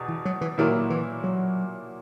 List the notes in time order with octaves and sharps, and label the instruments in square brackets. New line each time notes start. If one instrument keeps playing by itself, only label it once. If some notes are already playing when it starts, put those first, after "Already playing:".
Already playing: [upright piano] E2 B2
[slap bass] E3
F#3
E3
[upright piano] A#2 F#3 A#3 E4 [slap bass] D#3
[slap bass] E3
F#3